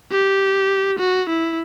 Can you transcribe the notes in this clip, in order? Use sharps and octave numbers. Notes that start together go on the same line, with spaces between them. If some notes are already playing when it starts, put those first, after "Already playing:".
G4
F#4
E4